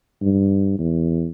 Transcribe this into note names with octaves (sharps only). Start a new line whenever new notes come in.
G2
E2